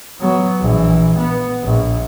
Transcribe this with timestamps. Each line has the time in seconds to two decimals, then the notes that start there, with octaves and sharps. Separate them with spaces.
0.20 F#3 B3
0.61 A#1 E3
1.17 B3
1.64 A#1